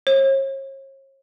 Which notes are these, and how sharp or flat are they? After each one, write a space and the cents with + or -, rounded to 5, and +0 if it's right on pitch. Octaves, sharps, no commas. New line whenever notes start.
C#5 -40